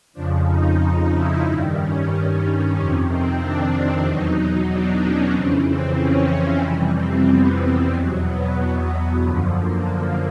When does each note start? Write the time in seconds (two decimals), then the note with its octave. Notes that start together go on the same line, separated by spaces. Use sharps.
0.13 F2 C#3 F3 D4
0.46 D#4
0.78 D#4
1.11 E4
1.43 G2 D#3 G3 D#4
1.76 C#4
2.73 F2 C3 D#3 C#4
3.06 C4
3.38 D4
3.71 D4
4.03 E2 B2 F#3 D#4
4.68 D4
5.00 C#4
5.32 F2 C#3 E3 C4
5.65 C4
5.98 C#4
6.62 F2 C3 E3 G3
6.95 C4
7.28 B3
7.92 E2 B2 F#3
8.25 B3
8.57 B3
9.22 F#2 D3 F3
9.55 A#3
9.88 A#3